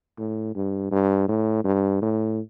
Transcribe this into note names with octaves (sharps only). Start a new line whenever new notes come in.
A2
G2
G2
A2
G2
A2